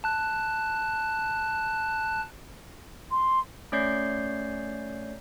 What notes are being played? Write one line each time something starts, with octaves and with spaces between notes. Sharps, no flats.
A5 F#6
C6
A3 C#4 C#5 D5 G6 C7